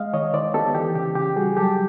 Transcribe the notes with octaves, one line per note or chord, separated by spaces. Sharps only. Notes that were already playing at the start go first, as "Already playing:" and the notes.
Already playing: G#3 D#5 F5
D#3 C#5 D#5
D#3 C5 D5
B3 G4 A4
E3 G4
C#3 G4
C#3 G4
G3 F#4 G#4
F#3 G4 A4